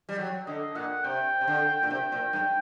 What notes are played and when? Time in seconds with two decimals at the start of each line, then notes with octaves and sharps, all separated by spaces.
0.09 G3
0.19 F#3
0.47 D3 D#5
0.75 A#2 F#5
1.04 C3 G5
1.41 C3
1.47 D3
1.83 A#2
1.90 C3 G5
2.12 A#2
2.33 G2